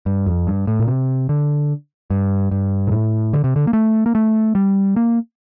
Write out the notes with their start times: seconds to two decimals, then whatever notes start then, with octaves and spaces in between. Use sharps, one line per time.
0.06 G2
0.26 F2
0.47 G2
0.67 A2
0.80 A#2
0.88 C3
1.29 D3
2.10 G2
2.51 G2
2.87 A#2
2.91 A2
3.33 D3
3.44 C3
3.56 D3
3.67 A#3
3.73 A3
4.06 A#3
4.15 A3
4.55 G3
4.96 A#3